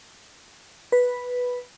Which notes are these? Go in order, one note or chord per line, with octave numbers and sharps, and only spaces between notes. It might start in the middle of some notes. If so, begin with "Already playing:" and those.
B4